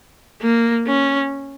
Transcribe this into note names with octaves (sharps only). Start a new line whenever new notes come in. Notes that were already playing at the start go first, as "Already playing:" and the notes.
A#3
C#4